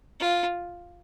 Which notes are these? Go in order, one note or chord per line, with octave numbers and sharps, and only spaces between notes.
F4